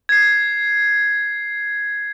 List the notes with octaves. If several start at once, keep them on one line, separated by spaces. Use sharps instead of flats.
G#6 C7